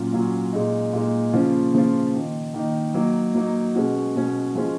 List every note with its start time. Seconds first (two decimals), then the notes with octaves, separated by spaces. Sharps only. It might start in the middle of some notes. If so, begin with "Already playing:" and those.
Already playing: A#2 F#3 C#4 F4
0.13 A#2 F#3 C#4 F4
0.53 A#2 G#3 D#4
0.93 A#2 G#3 D#4
1.33 C#3 F3 A#3 C#4 F4
1.74 C#3 F3 A#3 C#4 F4
2.14 D#3 A#3 D#4
2.54 D#3 A#3 D#4
2.94 F#3 A#3 D#4
3.35 F#3 A#3 D#4
3.75 B2 G#3 C#4 F#4
4.15 B2 G#3 C#4 F#4
4.55 F3 G#3 C#4 F4